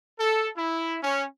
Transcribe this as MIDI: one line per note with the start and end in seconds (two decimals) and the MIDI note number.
0.19 0.49 69
0.57 0.98 64
1.03 1.24 61